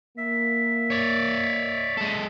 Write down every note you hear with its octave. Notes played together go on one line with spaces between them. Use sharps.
A#3 E5
C#5 D5
G#3 A4